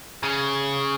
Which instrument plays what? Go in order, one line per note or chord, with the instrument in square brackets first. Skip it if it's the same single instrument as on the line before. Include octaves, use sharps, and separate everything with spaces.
[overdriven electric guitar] C#3